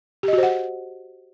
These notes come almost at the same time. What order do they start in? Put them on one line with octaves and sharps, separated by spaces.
G4 D#5 F#4 C5 F#5